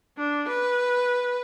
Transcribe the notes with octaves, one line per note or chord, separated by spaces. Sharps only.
D4
B4